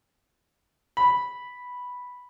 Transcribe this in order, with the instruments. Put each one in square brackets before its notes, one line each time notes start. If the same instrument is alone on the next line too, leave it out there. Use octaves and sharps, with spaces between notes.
[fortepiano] B5